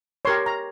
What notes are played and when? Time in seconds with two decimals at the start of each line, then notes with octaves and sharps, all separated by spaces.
0.25 G4 A#4 C#5 C6
0.46 A#5